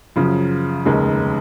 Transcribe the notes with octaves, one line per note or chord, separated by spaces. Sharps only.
F#2 C#3 F3
F1 D#2 C#3 G#3